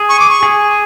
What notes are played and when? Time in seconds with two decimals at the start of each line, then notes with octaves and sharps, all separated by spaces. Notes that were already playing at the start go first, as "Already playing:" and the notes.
Already playing: G#4
0.09 C#6
0.20 D6
0.30 C#6
0.43 G#4